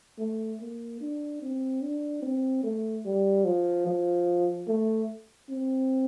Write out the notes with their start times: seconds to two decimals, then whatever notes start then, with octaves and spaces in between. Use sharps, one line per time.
0.19 A3
0.60 A#3
1.01 D4
1.42 C4
1.82 D4
2.22 C4
2.64 A3
3.05 G3
3.45 F3
3.87 F3
4.68 A3
5.49 C4